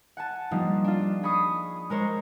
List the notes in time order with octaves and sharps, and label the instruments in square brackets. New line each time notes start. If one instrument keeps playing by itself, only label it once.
[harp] F#5 G#5 A5
F3 G3 A#3 D4 D#4
D4 F4
G#4 B5 C#6 D#6 C7
G#3 A#4 C5 C#5